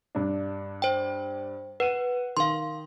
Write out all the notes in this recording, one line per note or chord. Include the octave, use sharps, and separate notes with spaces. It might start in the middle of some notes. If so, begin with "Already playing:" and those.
G2 D4
C5 G5
B4 F#5 D#7
D#3 F5 C6